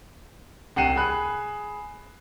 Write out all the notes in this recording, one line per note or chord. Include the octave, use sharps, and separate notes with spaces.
C2 F#5 G5 C7 D#7 E7
G#4 B5 F#6